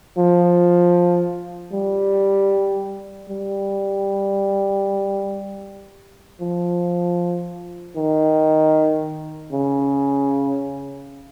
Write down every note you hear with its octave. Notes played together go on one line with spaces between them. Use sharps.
F3
G3
G3
F3
D#3
C#3